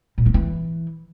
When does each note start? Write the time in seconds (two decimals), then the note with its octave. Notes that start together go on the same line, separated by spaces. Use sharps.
0.18 A#2
0.26 A#3
0.34 E3